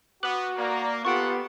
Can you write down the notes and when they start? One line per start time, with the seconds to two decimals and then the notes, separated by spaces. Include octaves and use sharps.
0.23 B3 F#4 D6 F#6 F#7
0.57 A#3 D5 A#5
1.05 B3 F4 G4 A4 F#5 C#6 D7